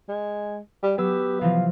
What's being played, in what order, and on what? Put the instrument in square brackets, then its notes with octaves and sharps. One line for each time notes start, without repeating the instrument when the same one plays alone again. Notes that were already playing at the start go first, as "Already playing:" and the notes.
[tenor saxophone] G#3
G3
[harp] F#3 E6 [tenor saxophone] B3 [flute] G4
[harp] C3 E3 F3 [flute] F5